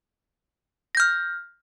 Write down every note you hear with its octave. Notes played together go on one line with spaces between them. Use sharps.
F6 G6 A#6